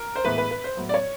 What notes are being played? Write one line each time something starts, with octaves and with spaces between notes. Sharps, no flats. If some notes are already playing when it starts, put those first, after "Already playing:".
Already playing: A#4
C5
A2 E3 G#3 B3 B4
B4
B4
C5
A2 F#3 B3
D5
C#5